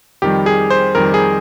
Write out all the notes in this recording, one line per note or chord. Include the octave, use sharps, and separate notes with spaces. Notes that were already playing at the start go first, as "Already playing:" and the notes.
F2 D#3 G3 G4
G#4
C5
F2 D#3 G3 A#4
G#4